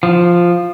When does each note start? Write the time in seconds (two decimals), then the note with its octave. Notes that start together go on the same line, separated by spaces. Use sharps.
0.03 F3